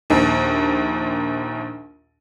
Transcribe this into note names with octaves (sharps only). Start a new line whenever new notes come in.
A#1 D#2